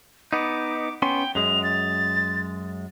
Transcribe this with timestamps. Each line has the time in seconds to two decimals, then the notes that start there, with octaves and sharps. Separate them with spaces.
0.33 B3 D#4 D6
1.02 B3 C#4 G5 C6
1.35 F#2 G#3 F7
1.64 A6